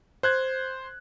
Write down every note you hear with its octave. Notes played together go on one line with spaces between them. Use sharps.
C5 F#6 G#6